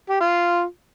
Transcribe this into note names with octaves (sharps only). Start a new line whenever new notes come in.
G4
F4